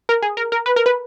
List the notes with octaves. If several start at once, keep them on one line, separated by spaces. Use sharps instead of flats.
A#4
G#4
A#4
A#4
B4
A#4
B4